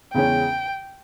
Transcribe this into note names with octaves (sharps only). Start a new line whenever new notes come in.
E2 C#3 G#3 C#4 G5